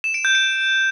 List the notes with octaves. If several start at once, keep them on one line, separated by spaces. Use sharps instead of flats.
E7
D7
G6
D7